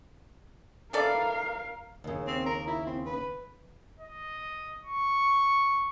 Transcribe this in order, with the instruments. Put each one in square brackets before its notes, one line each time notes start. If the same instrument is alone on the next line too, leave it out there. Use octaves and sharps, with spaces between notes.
[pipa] E3 A4 D5 [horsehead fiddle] A#4 F5
[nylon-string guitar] D#2 C#3
[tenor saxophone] C4
A#4
E4
C4
B4
[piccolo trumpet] D#5
C#6